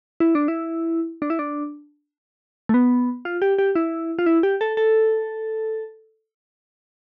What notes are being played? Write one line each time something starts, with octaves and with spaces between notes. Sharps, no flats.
E4
D4
E4
D4
E4
D4
A3
B3
F4
G4
G4
E4
F4
E4
G4
A4
A4